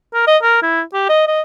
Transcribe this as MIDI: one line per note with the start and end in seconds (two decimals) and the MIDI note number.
0.14 0.26 70
0.27 0.37 75
0.42 0.59 70
0.62 0.82 64
0.93 1.07 67
1.09 1.25 75
1.27 1.41 75